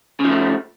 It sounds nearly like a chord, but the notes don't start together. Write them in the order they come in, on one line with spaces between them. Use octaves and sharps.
C#3 F3 A3